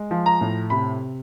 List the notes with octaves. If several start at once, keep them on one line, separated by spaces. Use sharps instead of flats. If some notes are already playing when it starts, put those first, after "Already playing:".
Already playing: G#3
F3
A#5
A2
C3 B5